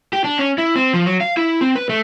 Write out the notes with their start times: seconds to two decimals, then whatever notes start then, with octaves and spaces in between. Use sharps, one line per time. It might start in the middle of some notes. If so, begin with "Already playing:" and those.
0.13 G4
0.24 D4
0.39 C#4
0.58 E4
0.76 C4
0.94 F3
1.06 F#3
1.21 F5
1.37 E4
1.61 C4
1.76 B4
1.89 A3